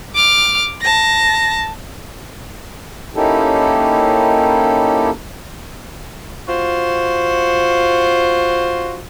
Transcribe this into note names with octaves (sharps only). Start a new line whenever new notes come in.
D6 F6
A5 A#6
A#3 C#4 D#4 E4 G4 A4
F4 F#4 C5